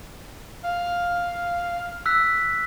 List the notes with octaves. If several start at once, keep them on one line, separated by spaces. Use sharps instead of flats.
F5
E6 F#6 B6